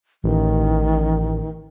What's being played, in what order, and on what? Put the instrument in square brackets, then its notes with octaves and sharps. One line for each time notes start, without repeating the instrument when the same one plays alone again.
[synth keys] A1 [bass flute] D#3